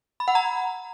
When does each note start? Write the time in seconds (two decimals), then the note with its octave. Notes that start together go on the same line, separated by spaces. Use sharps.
0.20 B5
0.28 F#5
0.35 A#5